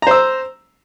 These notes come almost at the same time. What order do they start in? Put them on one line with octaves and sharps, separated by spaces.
A#5 C5 E6